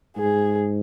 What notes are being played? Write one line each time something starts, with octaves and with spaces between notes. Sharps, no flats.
G#2 G#4